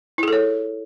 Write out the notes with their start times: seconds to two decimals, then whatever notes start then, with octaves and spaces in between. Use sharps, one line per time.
0.18 E4
0.23 G#4
0.28 A4
0.32 C#5